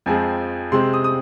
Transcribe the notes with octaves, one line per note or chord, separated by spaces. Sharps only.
F2 F3 G#3 C4 G#5
C3 G#3 C4 C6
D#6
D#6